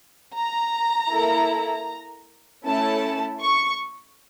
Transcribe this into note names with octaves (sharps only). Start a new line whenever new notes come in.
A#5
A#3 E4 A4
A3 C#4 E4 A4 A5
C#6